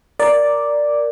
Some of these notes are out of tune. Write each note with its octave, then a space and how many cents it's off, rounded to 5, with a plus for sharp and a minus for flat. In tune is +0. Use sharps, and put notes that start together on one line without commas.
A#4 +0 D5 +0